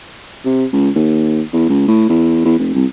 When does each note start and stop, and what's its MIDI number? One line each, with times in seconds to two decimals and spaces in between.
0.45 0.65 48
0.73 0.90 37
0.95 1.42 39
1.52 1.67 40
1.69 1.87 37
1.88 2.06 45
2.09 2.44 40
2.45 2.57 40
2.59 2.71 29
2.75 2.85 36